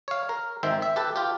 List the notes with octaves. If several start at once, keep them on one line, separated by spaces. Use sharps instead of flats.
C#5 F5
A#4
G#1 D#3 C5 E5 G5
E5
G4 A4 B4 A5
F4 G4